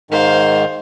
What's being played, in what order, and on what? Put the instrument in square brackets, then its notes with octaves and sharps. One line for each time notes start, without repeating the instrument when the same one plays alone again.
[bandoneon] G#2 D#3 [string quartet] C5 F5